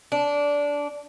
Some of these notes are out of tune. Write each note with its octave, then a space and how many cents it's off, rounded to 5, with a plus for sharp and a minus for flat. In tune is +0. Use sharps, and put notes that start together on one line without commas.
D4 -15